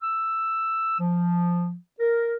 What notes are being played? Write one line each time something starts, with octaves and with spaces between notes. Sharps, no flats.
E6
F3
A#4